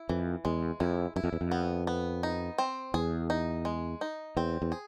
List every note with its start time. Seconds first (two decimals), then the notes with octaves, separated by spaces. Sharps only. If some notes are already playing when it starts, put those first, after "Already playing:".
Already playing: E4
0.09 F2 E3
0.45 E2 G#3
0.80 F2 E4
1.16 F#2 E4
1.24 F2
1.33 E2
1.41 F2
1.51 B3
1.87 B3
2.23 D#4
2.58 C4
2.94 E2 G#4
3.30 D#4
3.65 G#3
4.01 D#4
4.37 E2 C4
4.62 E2
4.72 G#4